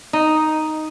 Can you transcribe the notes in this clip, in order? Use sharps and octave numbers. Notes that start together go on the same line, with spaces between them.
D#4